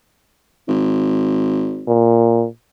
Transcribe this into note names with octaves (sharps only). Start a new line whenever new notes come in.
G#1
A#2